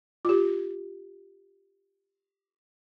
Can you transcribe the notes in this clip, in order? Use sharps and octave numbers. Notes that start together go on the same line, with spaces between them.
F4 G4